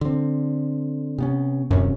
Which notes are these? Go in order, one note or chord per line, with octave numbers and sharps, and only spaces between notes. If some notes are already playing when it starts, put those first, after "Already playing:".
D3 C4
C3 B3 C#4
D#1 F#2 C3 C#4